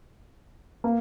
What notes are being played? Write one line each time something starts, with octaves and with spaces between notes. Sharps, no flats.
A#3